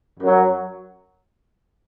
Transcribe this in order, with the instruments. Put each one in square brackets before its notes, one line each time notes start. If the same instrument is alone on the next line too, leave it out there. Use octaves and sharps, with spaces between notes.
[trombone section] F#2 F#3